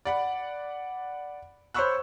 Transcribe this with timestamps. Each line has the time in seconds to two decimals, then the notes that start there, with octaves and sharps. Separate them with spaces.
0.05 D5 F#5 B5
1.74 C5 C#5 B5 C#6 E6 F#6